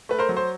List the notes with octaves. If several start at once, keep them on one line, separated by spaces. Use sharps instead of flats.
A3 B4
A#4 C5
F#3
C5